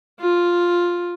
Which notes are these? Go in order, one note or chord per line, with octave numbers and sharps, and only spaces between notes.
F4